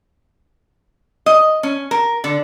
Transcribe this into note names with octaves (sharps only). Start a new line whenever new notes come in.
D#5
C#4
A#4
D3